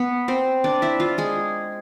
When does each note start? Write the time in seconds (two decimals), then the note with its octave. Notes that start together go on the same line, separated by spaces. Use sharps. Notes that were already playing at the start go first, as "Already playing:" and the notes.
Already playing: B3 B4
0.28 C4 C5
0.64 D4 D5
0.82 E4 E5
1.00 F4 F5
1.18 G#3 G#4